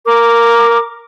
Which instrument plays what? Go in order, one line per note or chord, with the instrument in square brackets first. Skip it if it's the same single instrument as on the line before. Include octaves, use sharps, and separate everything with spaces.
[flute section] A#4 D6